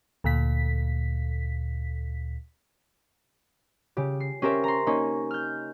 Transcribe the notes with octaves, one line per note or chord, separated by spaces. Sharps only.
D2 A#2 B6
C#3 G4
C7
C#4 G4 A#4 C5 E5
A#5 C6
A#3 C#4 D#4
F6 G6